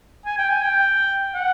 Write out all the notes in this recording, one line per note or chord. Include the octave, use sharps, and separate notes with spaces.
G#5
G5
G#5
G5
F#5